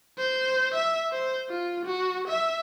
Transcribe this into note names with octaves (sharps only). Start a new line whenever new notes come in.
C5
E5
C5
F4
F#4
E5